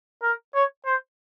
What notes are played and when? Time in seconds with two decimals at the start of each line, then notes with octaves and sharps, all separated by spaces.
0.23 A#4
0.54 C#5
0.86 C5